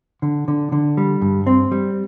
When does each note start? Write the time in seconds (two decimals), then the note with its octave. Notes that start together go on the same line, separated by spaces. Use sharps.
0.22 D3
0.48 D3
0.72 D3
0.97 G3
1.22 G2
1.47 C4
1.72 G3